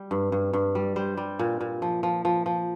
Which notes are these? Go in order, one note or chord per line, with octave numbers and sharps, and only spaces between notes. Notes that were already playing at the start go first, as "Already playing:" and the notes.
Already playing: G3
G2
G2
G2
G3
G3 C5
G3
A#2
A#2
F3
F3
F3
F3